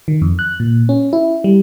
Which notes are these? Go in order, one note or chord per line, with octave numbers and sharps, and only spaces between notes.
D#3
F2
F#6
A#2
C#4
E4
G3